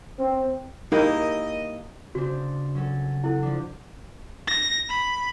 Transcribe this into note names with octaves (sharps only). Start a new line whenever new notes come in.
C4
A#3 D#4 E4 G4 A#4 D#5
C#3 C4 D4 F#4
F#3 C#4 A4
E4 A4 F#5
F3 D4
A#6
B5